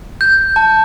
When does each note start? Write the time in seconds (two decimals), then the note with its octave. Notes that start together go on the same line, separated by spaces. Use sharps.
0.21 G6
0.56 A5